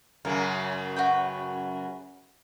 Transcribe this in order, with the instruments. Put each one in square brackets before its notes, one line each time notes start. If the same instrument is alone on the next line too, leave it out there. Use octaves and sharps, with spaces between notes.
[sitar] F#2 C#3 F#3 [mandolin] A#4
[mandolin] F#4 B4 G5